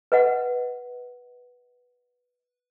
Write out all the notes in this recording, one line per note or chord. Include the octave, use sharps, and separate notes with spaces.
B4 D#5 F#5